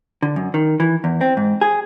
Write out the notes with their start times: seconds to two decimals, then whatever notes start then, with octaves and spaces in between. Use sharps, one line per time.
0.22 D3
0.36 F#2
0.54 D#3
0.80 E3
1.04 E2
1.21 C4
1.37 G#2
1.61 G#4